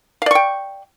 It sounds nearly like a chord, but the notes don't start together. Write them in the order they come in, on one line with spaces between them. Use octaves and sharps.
F5 D5 C#6 G5